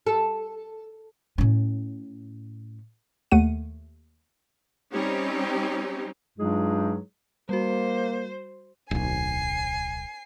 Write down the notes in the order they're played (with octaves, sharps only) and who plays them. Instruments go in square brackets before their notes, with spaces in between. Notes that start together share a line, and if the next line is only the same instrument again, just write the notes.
[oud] A4
[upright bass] A2 C#4
[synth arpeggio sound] D#2 A3 F#5 D#7
[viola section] G3 C4 C#4 D#4 G4
[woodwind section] G2 F#3 G#3 D#4 F4 G#4
[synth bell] G3 F#4 [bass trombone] A#3 [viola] C5
[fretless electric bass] D1 B1 [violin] G#5 C7